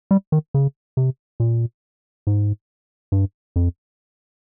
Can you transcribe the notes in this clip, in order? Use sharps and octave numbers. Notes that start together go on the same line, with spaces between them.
G3
D#3
C#3
C3
A#2
G#2
G2
F2